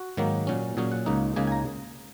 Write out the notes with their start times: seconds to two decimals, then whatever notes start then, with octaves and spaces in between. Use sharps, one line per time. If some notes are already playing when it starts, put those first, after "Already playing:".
Already playing: F#4
0.17 G#2 D#3 F#3 A#3
0.47 A#2 F#3 C#4
0.77 A#2 F#3 C#4 G#4
0.92 F#5
1.06 C#2 C#3 A#3 D#4
1.36 C#2 C#3 A#3 D#4 G#5
1.47 G#5
1.52 A#5